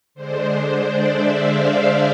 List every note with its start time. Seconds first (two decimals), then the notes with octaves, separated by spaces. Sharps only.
0.14 D3 G#3 D4 C5
0.46 C5
0.78 D5
1.09 E5
1.42 F5